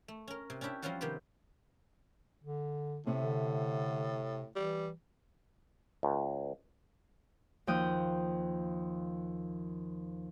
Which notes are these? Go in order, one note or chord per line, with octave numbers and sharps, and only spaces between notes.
A3
C#4 A#4
C3
C#4 D4 E4 G4 E5
F3 G3 C4 C#4 F4 F#4
C3 D#3 B3 C4 G4
D3
A2 C3 C4
D3
E3 G3
C#2
D#2 F3 G5 D#6 F#6